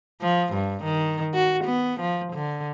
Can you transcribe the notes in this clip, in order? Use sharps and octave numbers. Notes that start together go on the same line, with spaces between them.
F3
G2
D#3
F#4
B3
F3
D3